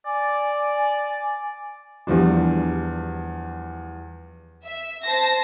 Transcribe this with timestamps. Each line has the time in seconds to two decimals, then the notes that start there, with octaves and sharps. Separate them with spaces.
0.06 D5 G#5
2.07 E2 F3 G3 D4
4.63 E5
5.03 C5 A5 A#6